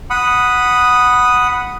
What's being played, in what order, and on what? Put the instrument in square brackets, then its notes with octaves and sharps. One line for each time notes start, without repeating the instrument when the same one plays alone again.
[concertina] F#5 B5 D#6